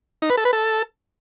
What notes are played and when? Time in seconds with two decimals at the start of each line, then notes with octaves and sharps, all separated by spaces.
0.22 D#4
0.30 B4
0.37 A4
0.45 B4
0.53 A4